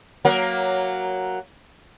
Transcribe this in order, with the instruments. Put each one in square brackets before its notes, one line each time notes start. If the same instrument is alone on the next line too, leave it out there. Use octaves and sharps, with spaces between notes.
[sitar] F#3 A#3